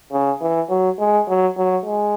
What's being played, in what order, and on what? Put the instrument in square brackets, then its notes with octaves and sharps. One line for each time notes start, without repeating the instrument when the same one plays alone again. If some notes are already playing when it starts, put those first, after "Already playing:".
[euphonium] C#3
E3
F#3
G#3
F#3
F#3
G#3